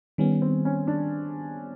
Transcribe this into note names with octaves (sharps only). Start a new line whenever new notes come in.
D#3 G3 B3 C#4
C4
C#4
D4